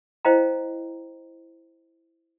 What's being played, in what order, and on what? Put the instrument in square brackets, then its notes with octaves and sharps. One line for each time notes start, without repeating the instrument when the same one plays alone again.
[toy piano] E4 C5 D#5 F5 G5 A#5